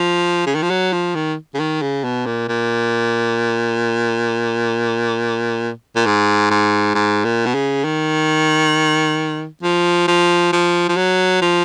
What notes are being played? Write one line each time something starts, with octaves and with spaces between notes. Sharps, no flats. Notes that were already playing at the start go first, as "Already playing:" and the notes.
Already playing: F3
C#3
D#3
F3
F#3
F3
D#3
C#3
D#3
C#3
B2
A#2
A#2
A#2
G#2
G#2
G#2
A#2
B2
C#3
D#3
F3
F3
F3
F3
F#3
F3